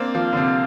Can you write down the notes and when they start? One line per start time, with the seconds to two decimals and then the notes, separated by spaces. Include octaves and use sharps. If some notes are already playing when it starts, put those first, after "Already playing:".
Already playing: A#3 C4 D4
0.14 F3 F5
0.33 D3
0.37 C3